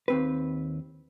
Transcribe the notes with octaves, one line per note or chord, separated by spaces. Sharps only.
D#2 C4 B4